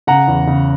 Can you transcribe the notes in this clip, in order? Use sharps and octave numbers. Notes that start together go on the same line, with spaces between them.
C#3 F#5 A#5
E2
C#3